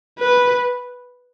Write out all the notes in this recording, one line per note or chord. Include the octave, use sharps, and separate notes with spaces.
B4